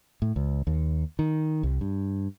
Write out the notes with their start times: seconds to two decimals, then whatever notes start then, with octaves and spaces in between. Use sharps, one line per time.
0.22 A2
0.36 C#2
0.67 D#2
1.19 D#3
1.63 C2
1.81 G2